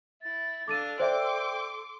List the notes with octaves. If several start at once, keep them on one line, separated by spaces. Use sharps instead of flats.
E4 A6
D4 A4 F5 A5 D6 A6 D#7
C5 D5 E5 G5 C6 D6